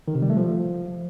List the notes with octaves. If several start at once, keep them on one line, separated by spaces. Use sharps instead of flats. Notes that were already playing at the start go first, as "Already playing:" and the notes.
D#3
C3
G3
A3
F3